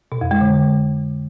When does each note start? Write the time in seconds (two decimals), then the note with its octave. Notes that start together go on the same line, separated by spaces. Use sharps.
0.12 B2
0.21 F2
0.31 G#3
0.41 D3